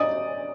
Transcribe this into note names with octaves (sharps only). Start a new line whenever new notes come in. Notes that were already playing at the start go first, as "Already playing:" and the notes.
Already playing: D5 D#5 D#6